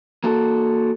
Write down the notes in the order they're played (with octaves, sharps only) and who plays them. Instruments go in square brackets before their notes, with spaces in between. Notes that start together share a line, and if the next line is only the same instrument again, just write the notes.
[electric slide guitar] A#3 F#4 A4